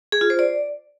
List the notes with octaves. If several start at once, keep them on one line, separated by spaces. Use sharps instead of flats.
G#4
F4
C5
D5